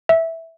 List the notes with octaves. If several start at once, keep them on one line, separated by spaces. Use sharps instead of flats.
E5